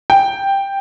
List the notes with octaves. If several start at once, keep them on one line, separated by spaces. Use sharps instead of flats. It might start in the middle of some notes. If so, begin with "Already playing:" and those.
G5